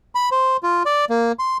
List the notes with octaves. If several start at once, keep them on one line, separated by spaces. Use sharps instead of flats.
B5
C5
F4
D5
A#3
C6